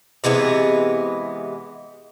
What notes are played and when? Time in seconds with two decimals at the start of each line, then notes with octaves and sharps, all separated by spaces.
0.24 C3 E3 G#3 B3